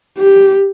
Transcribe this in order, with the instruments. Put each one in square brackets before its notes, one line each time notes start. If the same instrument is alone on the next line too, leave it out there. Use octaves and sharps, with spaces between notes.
[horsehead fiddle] G4